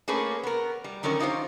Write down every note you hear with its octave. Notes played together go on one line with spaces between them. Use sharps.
A3 A#3 C#4 G#4 B4
B3 A#4
G3
D3 D#3 F#3 C#4 A#4
C#4 D#4 F4 G4 C5